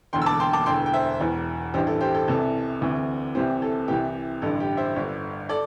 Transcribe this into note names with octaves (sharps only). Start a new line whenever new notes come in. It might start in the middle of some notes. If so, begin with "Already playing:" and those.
E1 E2 D3 G5 C6
E6
A5 D6
G5 C6
A5 D6
E1 E2 D3 G5 C6
G5
C5 E5
E1 E2 E3
A1 G2 E3 G4 C5
A4
G4 C5
A4
C2 C3 E3 A4
D2 C3 E3
C2 C3 E3 G4 C5
A4
C2 C3 E3 G4
A1 G2 D3 A4
G4
C5 E5
G1 G2 D3
A4 D5